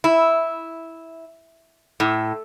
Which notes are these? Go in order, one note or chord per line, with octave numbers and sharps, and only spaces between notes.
E4
A2